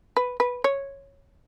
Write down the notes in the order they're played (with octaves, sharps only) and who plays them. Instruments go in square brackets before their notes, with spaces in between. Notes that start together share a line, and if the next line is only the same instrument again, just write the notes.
[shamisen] B4
B4
C#5